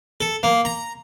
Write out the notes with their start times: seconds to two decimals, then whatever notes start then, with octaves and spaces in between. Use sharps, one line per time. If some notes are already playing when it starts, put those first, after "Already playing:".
0.21 A4
0.43 A#3
0.65 A#5